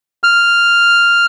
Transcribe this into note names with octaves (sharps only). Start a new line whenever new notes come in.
F6